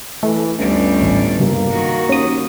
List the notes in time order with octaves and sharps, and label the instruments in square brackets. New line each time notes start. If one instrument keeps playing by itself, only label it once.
[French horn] E3 [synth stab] A3
[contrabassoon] G1 [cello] D2 G3 [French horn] C#4
[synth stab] A1
[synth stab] C#2 G2 [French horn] A#3
[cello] D#3 F#4
[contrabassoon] D#2 [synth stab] C#4 D#6